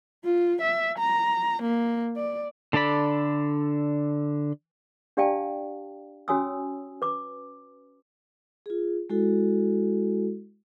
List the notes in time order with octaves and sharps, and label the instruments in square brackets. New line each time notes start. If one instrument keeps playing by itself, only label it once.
[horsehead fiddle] F4
E5
A#5
A#3
D5
[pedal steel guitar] D3 D4 A4 D5 B5
[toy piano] D4 G4 D5 F5 G5 A5
C#4 F#4 C#5 G#5 D#6 E6
B4 D6
[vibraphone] F4 G#4
G#3 E4 F#4 A4